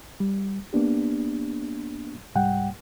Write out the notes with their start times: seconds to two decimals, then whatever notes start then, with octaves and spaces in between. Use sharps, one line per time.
0.20 G3
0.73 A#3 B3 D4 G4
2.35 C2 G#2 G3 F#5 G5